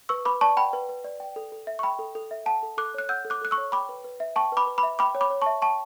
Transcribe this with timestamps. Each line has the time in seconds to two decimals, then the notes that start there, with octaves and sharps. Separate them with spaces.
0.09 B4 C#6 E6
0.25 B4 B5 D6
0.41 D5 A5 C#6
0.57 F#5 G5 B5
0.73 B4
0.89 B4
1.04 D5
1.20 G5
1.36 A4
1.52 A4
1.67 E5
1.79 C#6
1.83 G5 B5
1.99 A4
2.15 A4
2.31 E5
2.46 F#5 A5
2.63 A4
2.77 A4 D6 F#6
2.94 C#5 F#6
3.09 F#5 E6 G6
3.25 A4
3.30 D6 F#6
3.41 A4 F#6
3.51 C#6 E6
3.58 C#5
3.72 G5 B5 D6
3.89 B4
4.04 B4
4.20 E5
4.36 G5 A5 C#6
4.52 B4 B5 D6
4.67 B4
4.78 B5 D6
4.83 E5
4.99 G5 B5 D6
5.15 C#5
5.21 B5 D6
5.30 C#5
5.42 A5 C#6
5.46 E5
5.62 G5 A5 C#6